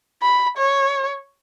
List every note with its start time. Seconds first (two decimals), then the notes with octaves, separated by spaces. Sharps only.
0.22 B5
0.57 C#5